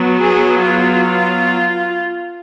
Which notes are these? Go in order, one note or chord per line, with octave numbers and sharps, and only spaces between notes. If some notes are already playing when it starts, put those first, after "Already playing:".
Already playing: F#3 B3
G#4
F4